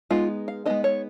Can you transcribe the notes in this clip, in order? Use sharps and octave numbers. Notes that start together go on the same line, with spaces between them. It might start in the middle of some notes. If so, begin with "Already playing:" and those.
G#3 B3 D#4 F4
F5
G#3 B3 D#4 D#5
C#5